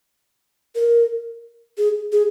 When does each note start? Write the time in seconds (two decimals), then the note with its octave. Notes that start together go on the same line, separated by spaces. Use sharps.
0.75 A#4
1.78 G#4
2.12 G#4